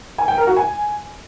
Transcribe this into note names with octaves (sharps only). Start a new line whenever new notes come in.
G#5
G5
A#4
F#4
G#5